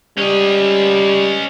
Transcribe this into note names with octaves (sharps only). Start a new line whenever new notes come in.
G3 C#4 D#5